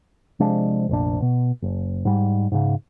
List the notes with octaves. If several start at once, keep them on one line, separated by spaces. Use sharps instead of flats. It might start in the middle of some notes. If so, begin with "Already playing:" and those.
C3 F3 G#3 D4
F1 A#1 D4
B2
F#1
G#2 G3
G#2 C#3